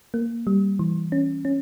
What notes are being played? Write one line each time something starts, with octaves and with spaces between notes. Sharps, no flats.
A#3
G3
E3
C#4
C#4